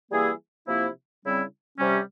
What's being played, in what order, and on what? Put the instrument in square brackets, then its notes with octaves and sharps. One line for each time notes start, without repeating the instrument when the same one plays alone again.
[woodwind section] E3 G3 A#3 E4 G#4
C3 F3 A#3 E4
C#3 G3 C4 E4
C3 G3 C#4